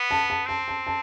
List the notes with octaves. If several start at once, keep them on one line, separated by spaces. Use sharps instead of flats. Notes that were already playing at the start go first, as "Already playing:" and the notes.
Already playing: B3
A5
A5
C4 A5
A5
A5